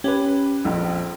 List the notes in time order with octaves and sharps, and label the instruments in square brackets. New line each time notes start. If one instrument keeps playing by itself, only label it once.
[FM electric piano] C#4 [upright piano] G4 B4
[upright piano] A#1 F2